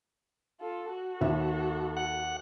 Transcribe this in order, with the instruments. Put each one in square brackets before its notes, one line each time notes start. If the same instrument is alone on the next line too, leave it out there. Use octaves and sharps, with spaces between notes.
[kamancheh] F4 A4
F#4 A4
[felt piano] D#2 E5
[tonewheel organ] F#5